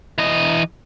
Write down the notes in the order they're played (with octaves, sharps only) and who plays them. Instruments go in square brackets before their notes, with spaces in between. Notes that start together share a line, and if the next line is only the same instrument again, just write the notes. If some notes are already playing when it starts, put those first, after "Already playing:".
[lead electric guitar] E3 D#5